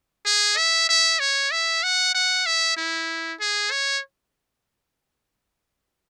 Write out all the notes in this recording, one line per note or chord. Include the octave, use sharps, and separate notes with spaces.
G#4
E5
E5
C#5
E5
F#5
F#5
E5
E4
G#4
C#5